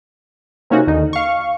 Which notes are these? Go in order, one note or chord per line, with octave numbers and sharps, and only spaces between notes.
C3 A#3 C#4 D#4 F#4
D#2 D3 D#4
F5 C#6